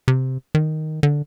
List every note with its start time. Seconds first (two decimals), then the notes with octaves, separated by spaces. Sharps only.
0.08 C3
0.55 D#3
1.03 D3